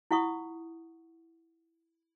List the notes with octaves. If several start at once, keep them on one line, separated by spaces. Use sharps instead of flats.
E4 F4 F#5 C#6 D#6